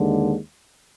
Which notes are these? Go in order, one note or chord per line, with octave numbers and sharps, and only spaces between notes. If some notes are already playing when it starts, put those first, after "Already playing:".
Already playing: D#2 D3 G#3